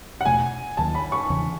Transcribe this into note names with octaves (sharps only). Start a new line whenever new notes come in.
F#5
E2 B2 A3 G#5
D#2 D#3 F#3 A5
B5
C#6
E2 C#3 E3